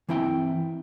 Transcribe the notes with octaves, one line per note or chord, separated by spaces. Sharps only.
E3 C4 E4 E5 G5